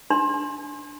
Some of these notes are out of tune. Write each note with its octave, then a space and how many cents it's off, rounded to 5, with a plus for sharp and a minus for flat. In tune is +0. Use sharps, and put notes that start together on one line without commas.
D4 +0 C6 +25